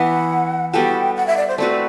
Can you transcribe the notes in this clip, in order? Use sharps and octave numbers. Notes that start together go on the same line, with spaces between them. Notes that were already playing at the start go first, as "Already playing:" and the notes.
Already playing: E3 B3 E4 F#5
G3 B3 F#4 A4 G5
F#5
E5
D5
C5
A3 C4 F#4 B4 D5